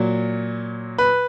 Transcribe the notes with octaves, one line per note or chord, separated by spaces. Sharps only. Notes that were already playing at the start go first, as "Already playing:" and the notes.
Already playing: A#2 F#3
B4